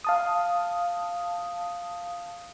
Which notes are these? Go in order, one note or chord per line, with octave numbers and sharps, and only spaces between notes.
F5 A5 D#6